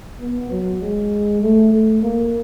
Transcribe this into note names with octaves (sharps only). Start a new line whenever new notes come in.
B3
F#3
G#3
A3
A3
A#3